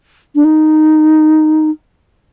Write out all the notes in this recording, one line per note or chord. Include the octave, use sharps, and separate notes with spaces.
D4
D#4